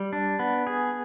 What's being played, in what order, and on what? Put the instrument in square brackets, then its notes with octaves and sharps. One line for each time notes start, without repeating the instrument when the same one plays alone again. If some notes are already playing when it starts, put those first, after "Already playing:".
Already playing: [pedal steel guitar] G3
D4
B3
G#4